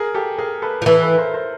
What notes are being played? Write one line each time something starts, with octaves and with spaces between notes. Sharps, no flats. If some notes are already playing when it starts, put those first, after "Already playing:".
Already playing: G#4 A#4
G4 A4
G#4 A#4
A4 B4
F3
E3 A4 B4
A4 B4
A#4 C5
A#4 C5